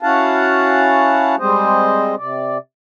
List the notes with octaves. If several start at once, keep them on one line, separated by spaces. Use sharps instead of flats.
C#4 E4 F#4 F5 F#5 A5
G3 G#3 C4 C5 D#5
C3 D5